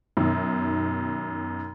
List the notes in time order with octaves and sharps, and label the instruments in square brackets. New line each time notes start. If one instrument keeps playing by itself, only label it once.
[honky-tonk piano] F#2 B2 D#3